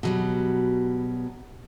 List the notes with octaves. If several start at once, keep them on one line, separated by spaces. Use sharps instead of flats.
B2 F#3 G3